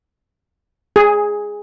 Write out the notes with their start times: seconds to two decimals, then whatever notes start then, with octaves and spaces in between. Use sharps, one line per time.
0.96 G#4